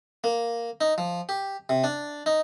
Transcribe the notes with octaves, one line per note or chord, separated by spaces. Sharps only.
A#3
D#4
F3
G4
C3
D4
D#4